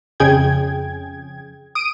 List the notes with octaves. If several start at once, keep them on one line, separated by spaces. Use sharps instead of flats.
F2 C#3 G#4 G5 G#6
D#6 D7 D#7